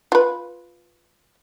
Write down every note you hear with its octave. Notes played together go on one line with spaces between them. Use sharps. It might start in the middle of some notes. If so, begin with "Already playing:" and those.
F4 B4